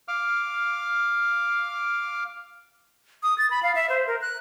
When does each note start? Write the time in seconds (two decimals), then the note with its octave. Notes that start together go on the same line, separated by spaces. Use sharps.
0.08 F5 D6 F6
3.23 D#6
3.38 A6
3.51 B5
3.63 F5
3.75 E5
3.90 C5
4.07 A#4
4.21 F#6